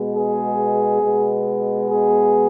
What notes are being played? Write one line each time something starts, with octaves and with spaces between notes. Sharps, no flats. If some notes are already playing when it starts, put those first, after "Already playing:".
Already playing: B2 G#3 B3
G#4
B2 G#3 B3
G#4